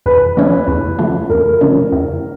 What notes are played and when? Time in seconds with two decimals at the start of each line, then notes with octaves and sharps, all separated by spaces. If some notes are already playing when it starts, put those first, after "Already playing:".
0.06 E2 B4
0.37 C#3 F3 A3 C#4
0.68 E2
0.99 C#3 F3 A3 C#4
1.30 E2 A#4
1.61 C#3 F3 A3 C#4
1.92 E2